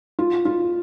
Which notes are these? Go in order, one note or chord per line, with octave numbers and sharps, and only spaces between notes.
F4
F4